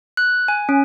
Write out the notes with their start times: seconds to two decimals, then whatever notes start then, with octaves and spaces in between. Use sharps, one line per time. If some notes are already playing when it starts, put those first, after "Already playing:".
0.17 F#6
0.48 G#5
0.69 C#4